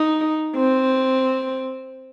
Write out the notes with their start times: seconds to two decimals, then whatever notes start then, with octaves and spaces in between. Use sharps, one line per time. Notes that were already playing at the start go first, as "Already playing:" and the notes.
Already playing: D#4
0.56 C4